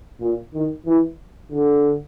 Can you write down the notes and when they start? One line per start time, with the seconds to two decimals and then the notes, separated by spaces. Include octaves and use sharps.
0.20 A#2
0.54 D#3
0.86 E3
1.51 D3